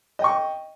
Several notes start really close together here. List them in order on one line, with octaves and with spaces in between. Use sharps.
D#5 G5 C#6